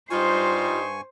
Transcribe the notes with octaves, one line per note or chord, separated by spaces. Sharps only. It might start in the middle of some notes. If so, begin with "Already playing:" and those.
G2 G3 D#4 F4 C5 G#5 C#6